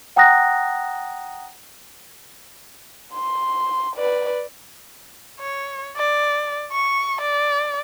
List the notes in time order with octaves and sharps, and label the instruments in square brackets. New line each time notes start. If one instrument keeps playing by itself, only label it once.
[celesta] F#5 G5 A#5 D#6 F#6 A#6
[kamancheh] C6
B4 D5
[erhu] C#5
D5
C#6
D5